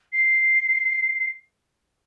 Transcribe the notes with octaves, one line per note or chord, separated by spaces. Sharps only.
C7